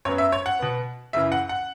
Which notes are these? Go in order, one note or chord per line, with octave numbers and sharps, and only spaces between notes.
F#2 F#3 B3 C#5
E5
C#5
F#5
B2 B3
F#2 C#3 E3 E5
F#5
F#5